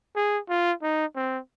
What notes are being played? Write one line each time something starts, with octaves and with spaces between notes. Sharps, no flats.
G#4
F4
D#4
C4